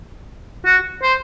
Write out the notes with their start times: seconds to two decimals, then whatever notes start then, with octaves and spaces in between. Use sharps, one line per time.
0.66 F#4
1.02 C5